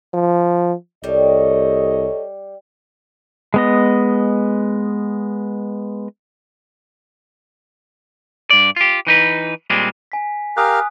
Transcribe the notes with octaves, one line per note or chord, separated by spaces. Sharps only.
F3
C2 G3 A4 C#5 D#5
G#3 B3 D#5
G2 D5
F4 G4
E3 D#4 B4
A#2 G3 G#3 C4
G#5 B6
G4 A#4 F5 G#5 D#6 F#6